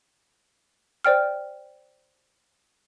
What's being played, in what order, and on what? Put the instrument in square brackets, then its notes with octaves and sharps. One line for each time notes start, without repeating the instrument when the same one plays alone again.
[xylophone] C5 D5 G5 F6